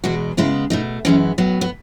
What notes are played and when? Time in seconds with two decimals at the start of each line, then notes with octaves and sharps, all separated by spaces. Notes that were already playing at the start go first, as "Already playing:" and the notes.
0.04 E2 B2 G#3 B3 F#4
0.37 C#3 G#3 B3 E4
0.70 B2 A3 D#4
1.05 F#2 E3 G#3 B3 C#4
1.38 A2 F#3 B3
1.61 B3